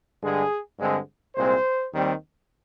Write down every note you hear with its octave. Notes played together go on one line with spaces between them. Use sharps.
G2 D3 G#3 G#4
G2 D3 G#3 C4
C2 A#2 G#3 C4 C5
D#2 D#3 G3 C4